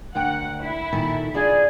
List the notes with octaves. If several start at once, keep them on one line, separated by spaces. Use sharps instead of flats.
D2 A#4 F#5 G5
E4
A#2 D#3 A4
D4 F4 G#4 D5